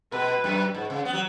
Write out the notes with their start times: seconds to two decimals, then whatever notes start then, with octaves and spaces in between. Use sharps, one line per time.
0.12 B2 B4
0.44 F#2
0.74 G#2
0.90 C#3
1.05 B3
1.13 F#3